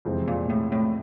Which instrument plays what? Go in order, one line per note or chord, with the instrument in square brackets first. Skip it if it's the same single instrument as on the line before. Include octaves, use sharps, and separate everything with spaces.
[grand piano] F2 C3 E3 G#3 C4
[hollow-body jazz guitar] A#2
A2
A2